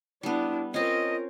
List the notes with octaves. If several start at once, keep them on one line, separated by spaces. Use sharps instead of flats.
G3 B3 D4 E4
C4 C#4 F4 A#4 D#5